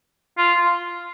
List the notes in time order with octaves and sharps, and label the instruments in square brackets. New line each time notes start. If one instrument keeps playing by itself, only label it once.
[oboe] F4